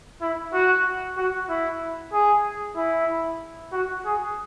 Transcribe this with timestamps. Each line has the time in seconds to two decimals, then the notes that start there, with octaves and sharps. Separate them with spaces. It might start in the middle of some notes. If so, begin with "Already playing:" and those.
0.22 E4
0.53 F#4
1.17 F#4
1.49 E4
2.13 G#4
2.76 E4
3.72 F#4
4.05 G#4